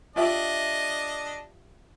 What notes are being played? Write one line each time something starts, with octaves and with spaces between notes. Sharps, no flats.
D4 F4 G4 D#5 E5